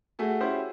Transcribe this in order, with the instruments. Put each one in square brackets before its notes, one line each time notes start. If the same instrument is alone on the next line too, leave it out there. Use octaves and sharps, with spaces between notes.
[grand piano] A3 [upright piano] F#4 G#4
[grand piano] C#4 E4 G4 C5